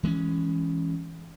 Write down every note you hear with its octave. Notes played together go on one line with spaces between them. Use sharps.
E3 G#3 A3 C#4